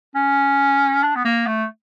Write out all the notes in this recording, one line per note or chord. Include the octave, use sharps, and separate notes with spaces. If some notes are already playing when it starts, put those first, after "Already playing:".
C#4
D4
B3
A#3
A3